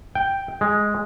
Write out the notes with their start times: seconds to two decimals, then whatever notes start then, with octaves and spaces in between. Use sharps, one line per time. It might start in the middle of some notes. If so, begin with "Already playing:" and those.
0.15 G5
0.61 G#3